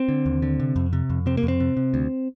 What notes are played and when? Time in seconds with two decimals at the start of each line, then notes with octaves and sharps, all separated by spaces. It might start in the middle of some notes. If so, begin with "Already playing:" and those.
Already playing: C4
0.09 D3
0.26 D#2
0.42 D3
0.60 C3
0.76 F2
0.93 C3
1.10 F2
1.26 C3 C4
1.37 A#3
1.43 F2
1.48 C4
1.60 C3
1.77 C3
1.94 D2